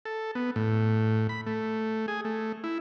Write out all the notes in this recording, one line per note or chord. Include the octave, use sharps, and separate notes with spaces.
A4
B3
A2
B5
A3
G#4
A3
E4